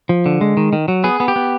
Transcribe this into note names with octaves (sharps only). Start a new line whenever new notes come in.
F3
D3
G#3
D#3
D#3
F#3
B3 G#4
B3
G4
B3